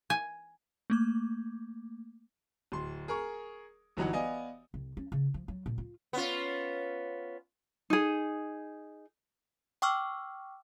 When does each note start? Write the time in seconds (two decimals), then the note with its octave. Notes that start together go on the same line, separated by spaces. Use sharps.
0.10 G#5
0.90 A3 A#3 D6
2.72 D1 C6
3.08 G#4 A#4 C#6
3.97 G1 E3 F#3 D#4 F#5
4.13 B3 D5 D#5 F5 G#5
4.74 C2
4.97 C#4
5.12 C#3
5.34 F3
5.48 F#3
5.66 A#2
5.78 F4
6.13 B3 C#4 F4
7.90 D#4 G#4
9.82 G5 C#6 D6 E6 F6